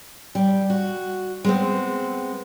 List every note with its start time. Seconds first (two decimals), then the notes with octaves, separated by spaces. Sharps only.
0.35 G3
0.70 F#4
1.45 G#3 B3 C4